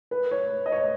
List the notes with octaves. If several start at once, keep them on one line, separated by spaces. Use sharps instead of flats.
B4
C#5
D#5
C#5